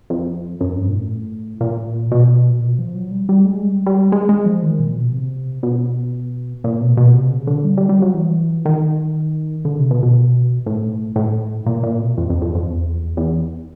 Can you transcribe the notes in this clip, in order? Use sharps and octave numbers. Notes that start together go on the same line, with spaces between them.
F2
F#2
G2
A#2
A2
A#2
B2
A#2
B2
F3
F#3
G3
G3
G#3
G3
G3
G#3
G#3
F3
D#3
A#2
B2
C3
B2
A#2
B2
B2
C3
C#3
D3
G3
G3
G3
F#3
E3
D#3
D3
C3
B2
B2
A2
A2
A#2
A#2
B2
F2
F2
F2
F2
E2
E2